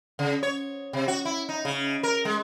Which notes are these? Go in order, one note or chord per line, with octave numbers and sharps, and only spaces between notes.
C#3
C#5
C3
F#4
E4
D#4
C#3
A#4
G#3